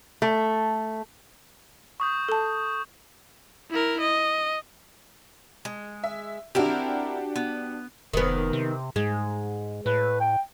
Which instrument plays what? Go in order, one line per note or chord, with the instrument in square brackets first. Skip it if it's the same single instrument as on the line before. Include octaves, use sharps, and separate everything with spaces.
[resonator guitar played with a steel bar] A3
[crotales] C#6 D#6 G6
[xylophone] A4 A5
[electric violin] E4 A#4
D#5
[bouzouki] G#3
[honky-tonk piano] E5
[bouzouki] C4 E4 A#4 [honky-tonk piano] D4 F#4 G4
[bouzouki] B3
[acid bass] F1 [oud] D#3 B3
[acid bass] C3
[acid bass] G#2 [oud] G#3
[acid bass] A2 [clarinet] B4
[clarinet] G5